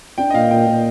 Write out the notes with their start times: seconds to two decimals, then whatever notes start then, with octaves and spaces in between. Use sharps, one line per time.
0.18 D4 G5
0.30 D#5
0.34 A#2 F5
0.51 A#2 G5
0.67 A#2